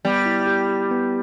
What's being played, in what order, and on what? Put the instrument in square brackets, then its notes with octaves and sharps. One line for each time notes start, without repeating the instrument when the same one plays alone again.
[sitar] G3 [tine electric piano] B3
[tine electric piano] E4
G4
G4
B3